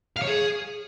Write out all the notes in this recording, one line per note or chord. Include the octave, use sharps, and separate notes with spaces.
F5
C#5
G#4